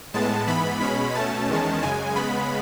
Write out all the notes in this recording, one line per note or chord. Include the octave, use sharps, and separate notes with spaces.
A2 G#3 B3 A5
G#2 E3 B3 B5
B2 G#3 C#4 B5
B2 A3 C#4 A5
E2 D#3 G#3 C#4
F#2 C#3 G#3 G#5
C#3 G#3 B3 B5